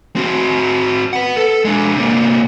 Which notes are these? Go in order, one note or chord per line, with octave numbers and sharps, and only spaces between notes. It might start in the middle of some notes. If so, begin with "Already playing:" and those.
C4 F#4
B4 F#5
A4
G#3 D4
C3 A#3